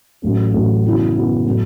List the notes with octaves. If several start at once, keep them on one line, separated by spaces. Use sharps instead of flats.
A1 A2 F#3 A3 C#4
A1 A2 F#3 A3 C#4
F#2 C#3 E3 B3 E4
F#2 C#3 E3 B3 E4
A2 F#3 A3